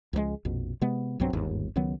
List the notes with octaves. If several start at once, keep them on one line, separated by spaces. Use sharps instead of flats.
C#2 F3 F#3 G#3
A#1 F2 B2
C3 G#3 B3
B1 G2 F#3 C4
G1 D#2 G#2
C#2 D#3 F#3 B3